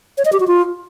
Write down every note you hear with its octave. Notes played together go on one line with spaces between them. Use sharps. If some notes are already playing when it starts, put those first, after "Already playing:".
C#5
D#5
G4
F#4
F4